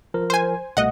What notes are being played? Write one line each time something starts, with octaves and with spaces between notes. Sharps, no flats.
F3 A#4
C5 G#5
C2 B2 A3 D#5 F#5